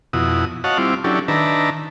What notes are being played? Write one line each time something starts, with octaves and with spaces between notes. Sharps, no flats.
F2 B2 E4 F#4 D#6
F#4 C#5 D#5 F5 F#5 A5
G3 C4 E4 F4 D6
F#3 C#4 D4 E4 G4 A4
D#3 D4 B4 E5 A5 A#5